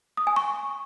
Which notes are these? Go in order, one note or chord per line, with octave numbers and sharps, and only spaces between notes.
D#6
G#5
C#6